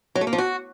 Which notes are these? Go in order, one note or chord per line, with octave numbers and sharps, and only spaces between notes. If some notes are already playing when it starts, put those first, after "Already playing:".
F#3
A3
A#3
F3
F#4